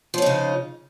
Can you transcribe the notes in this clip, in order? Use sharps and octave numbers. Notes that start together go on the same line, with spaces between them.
C#3 F3 C#4 D#4